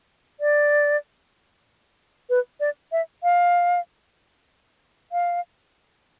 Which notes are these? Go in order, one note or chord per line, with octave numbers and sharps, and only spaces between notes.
D5
B4
D5
E5
F5
F5